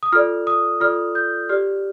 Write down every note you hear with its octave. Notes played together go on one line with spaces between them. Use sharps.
D#6
F4 A4 D5 F6
D#6
F4 A4 D5 F6
G6
G4 D5 F6